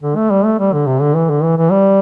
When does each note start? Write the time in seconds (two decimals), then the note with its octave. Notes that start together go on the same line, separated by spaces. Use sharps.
0.03 D3
0.16 A3
0.30 G3
0.44 A3
0.59 G3
0.73 D3
0.87 C3
1.01 D3
1.16 E3
1.30 D3
1.43 E3
1.57 E3
1.71 G3